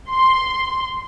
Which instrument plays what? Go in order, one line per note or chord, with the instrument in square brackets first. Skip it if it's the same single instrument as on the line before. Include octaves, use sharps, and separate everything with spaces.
[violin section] C6